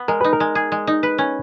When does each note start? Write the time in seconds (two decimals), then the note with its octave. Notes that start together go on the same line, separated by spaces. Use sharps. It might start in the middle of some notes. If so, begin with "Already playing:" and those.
Already playing: B3
0.08 G#3 A#4
0.21 D#4 B4
0.33 A#4
0.40 G#3
0.55 G#4
0.72 G#3
0.87 D#4
1.03 B4
1.18 C#4